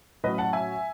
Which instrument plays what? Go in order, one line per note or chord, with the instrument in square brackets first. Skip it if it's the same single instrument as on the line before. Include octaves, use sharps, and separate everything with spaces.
[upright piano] A2 F#3 C#4 B4 D#5
F#5 A5
E5 G#5